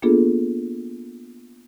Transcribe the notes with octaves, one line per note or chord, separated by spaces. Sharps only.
A#3 B3 D4 F4 G#4 A4